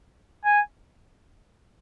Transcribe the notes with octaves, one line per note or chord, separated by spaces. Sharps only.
G#5